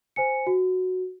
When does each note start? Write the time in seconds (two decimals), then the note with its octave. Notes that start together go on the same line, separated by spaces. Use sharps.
0.16 C5 G#5 C#7
0.47 F#4